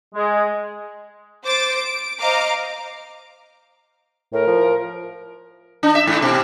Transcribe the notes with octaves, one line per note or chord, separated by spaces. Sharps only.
G#3
C5 D6 A6
D7
C5 D#5 F5 A#5 D6
A2 A#4
F3
D4
E5
G#2
B2